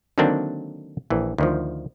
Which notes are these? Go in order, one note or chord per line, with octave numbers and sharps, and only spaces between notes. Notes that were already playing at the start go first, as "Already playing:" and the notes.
D3 D#3 F#3 A#3 C4 D4
A#1 E3
D2 D#3 F3